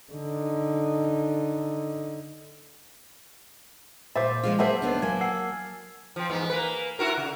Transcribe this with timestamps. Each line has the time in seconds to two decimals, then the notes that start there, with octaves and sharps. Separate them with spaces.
0.12 D3 D#4
4.16 A#2 C5 E5 D6 A6
4.43 F3 G#3 F4
4.59 F#3 A#3 G#4 C5 E5 F#5 A5
4.82 D#2 B3 D4
5.02 F#3 A#3 G#5 G#6
5.21 F#5 E6 C7
6.16 F3 C4
6.30 E2 G#2 B3
6.50 A#3 B4
6.99 E4 F#4 A#4
7.17 C#3